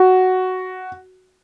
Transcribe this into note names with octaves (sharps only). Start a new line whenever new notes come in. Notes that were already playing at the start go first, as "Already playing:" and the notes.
Already playing: F#4